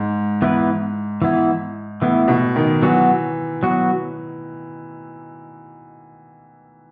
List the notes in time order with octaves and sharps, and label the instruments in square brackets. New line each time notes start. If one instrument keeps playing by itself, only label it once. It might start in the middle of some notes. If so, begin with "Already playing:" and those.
Already playing: [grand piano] G#2
[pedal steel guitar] E3 B3 E4 B4
E3 B3 E4
[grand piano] A2 [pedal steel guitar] E3 B3 E4
[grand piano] B2
D#3
[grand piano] E3 [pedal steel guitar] F#3 B3 F#4
[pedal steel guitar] F#3 B3 F#4